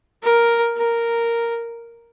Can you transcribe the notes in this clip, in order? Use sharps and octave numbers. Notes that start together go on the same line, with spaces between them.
A#4
A#4